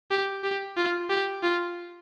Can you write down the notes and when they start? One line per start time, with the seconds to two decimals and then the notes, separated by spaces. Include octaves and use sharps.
0.11 G4
0.44 G4
0.77 F4
1.10 G4
1.43 F4